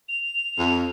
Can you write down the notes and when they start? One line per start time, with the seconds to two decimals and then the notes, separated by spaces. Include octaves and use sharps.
0.09 F7
0.58 F2